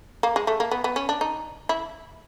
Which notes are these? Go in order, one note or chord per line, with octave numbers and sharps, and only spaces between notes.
A#3
G#3
A3
A#3
B3
B3
C#4
D4
D#4
E4